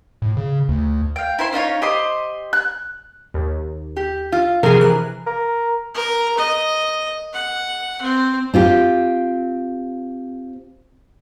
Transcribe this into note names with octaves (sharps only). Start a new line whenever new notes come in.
A2
C#3
D2
F5 G5
E4 C5 C6
C#4 D#4 F4 C#5
G4 C5 D#5 C6
F#6
D#2
G4
F4
C3 F3 G#4 A#4
E3 F#6
A#4
A#4
D#5
F#5
C4
C4 F4 G4